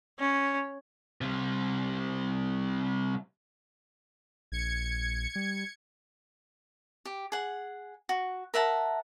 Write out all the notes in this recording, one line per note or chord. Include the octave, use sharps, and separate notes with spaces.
C#4
C3 G3
A#1 G#6 C#7
G3
G4
G#4 F#5
F#4
A#4 E5 F#5 A5